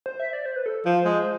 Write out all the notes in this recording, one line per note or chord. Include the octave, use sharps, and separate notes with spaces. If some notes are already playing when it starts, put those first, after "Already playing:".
C5
E5
D5
C5
B4
A4
F3 C5
G#3